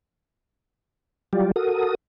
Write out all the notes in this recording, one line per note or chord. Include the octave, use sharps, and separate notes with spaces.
F#3 G3 F4 G4 D5
F#4 A4 A#4 D#6